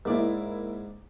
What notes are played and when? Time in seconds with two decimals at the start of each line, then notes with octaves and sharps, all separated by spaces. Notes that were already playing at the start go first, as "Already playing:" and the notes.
0.05 G#2 A#3 E4 D5